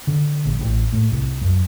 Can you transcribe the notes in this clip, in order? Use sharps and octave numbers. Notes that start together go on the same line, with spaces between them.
D3
A#1
A1
A2
C2
F#2